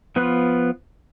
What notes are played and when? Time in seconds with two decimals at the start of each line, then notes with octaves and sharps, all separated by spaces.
0.16 F3 B3 F4 B4